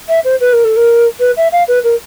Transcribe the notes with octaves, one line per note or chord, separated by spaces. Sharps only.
E5
C5
B4
A#4
A4
A#4
B4
E5
F5
B4
A#4